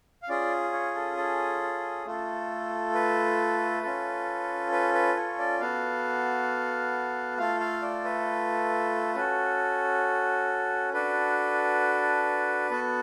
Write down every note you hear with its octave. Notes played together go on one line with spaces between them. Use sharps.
F5
C#4 F4 G#4 D5
C#5
A4
A4
A3 F4 A4
B4
C#4 F4 A4
B4
B4
C#5
D5
B3 F#4 A4 F5
A3 F4 A4 F5
F5
D5
B4
C#4 F#4 A4
D4 F#4 A4 B4
B3 F#4 A4